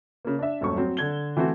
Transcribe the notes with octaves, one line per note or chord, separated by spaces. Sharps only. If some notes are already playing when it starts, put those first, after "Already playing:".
C#3 A#3
D4 E5
D#1 F#2 A3 C#6
F#3 C4
D3 G#6 G7
E3 A3 C4 F#4